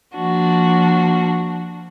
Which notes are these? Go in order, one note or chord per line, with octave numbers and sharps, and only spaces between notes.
F3 A#3 D4 F#4